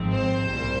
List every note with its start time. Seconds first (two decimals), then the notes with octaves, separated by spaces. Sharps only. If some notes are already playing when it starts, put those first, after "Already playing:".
Already playing: G#1 G#2 F3 C4
0.13 C5
0.43 C2 A#2 G3